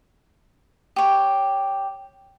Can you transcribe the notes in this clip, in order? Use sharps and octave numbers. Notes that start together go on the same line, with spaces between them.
G4 C#5